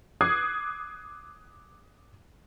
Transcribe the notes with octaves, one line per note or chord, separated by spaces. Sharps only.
D6 D#6 F#6 G#6 C7